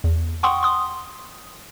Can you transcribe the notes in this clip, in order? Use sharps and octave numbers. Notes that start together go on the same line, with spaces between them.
E2
F#5 G5 C6 C#6 D#6
C6 D#6